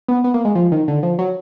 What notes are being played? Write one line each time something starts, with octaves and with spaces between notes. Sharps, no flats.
B3
B3
A#3
G#3
F3
D#3
D3
F3
F#3